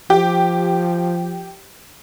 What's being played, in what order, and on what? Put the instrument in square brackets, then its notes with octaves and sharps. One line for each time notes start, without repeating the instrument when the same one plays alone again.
[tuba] F3 [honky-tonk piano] G4